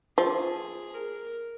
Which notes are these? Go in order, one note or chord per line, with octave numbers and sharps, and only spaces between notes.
F3 G#4
A#4